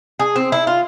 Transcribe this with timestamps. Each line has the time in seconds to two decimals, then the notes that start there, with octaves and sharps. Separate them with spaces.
0.19 G#4
0.36 C4
0.52 E4
0.67 F4